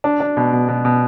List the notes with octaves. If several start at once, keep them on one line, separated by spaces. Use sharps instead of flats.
D4
D4
B2
B2
B2
B2